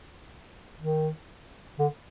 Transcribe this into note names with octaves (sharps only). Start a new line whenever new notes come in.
D#3
D3